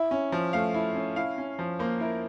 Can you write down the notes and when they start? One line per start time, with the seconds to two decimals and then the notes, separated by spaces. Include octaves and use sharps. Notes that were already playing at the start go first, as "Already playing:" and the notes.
Already playing: E4 E5
0.11 C#4
0.32 F3
0.53 A3 F5
0.74 E4
0.95 C#4
1.16 E4 F5
1.38 C#4
1.59 F3
1.79 A#3 C5
2.00 E4 A#4